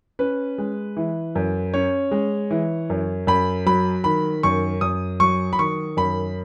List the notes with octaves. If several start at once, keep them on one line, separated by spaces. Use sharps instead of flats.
C#4 B4
G#3
E3
F#2
C#4 C#5
G#3
E3
F#2
F#2 B5
F#3 B5
D#3 B5
F#2 C#6
F#2 D#6
F#3 C#6
B5
D#3 C#6
F#2 B5